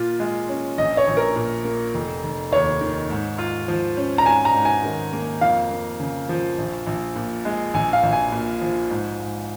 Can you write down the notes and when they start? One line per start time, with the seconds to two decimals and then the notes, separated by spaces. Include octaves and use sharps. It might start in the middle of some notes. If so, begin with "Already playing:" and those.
Already playing: A#2 F4
0.20 G#3
0.49 C#4
0.78 A#1 D#5
0.97 C#5
1.07 A#1
1.17 A#4
1.36 A#2
1.65 A#3
1.94 F1
2.23 F1
2.52 D#2 C#5
2.81 D#3
3.10 G#2
3.38 F4
3.68 F3
3.97 C#4
4.18 A#5
4.26 G#2 G#5
4.45 A#5
4.55 G#2
4.65 G#5
4.84 D#3
5.13 A#3
5.41 F2 F5
5.71 A#3
6.00 C#3
6.29 F3
6.58 A#1
6.87 A#1
7.16 A#2
7.45 G#3
7.74 A#1 G#5
7.93 F5
8.03 A#1
8.13 G#5
8.32 A#2
8.61 F3
8.90 G#2
9.19 G#2